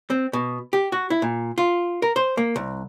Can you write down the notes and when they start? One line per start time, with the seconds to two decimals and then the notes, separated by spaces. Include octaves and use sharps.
0.10 C4
0.33 B2
0.73 G4
0.92 F#4
1.10 E4
1.22 A#2
1.58 F4
2.02 A#4
2.16 C5
2.37 A#3
2.56 C2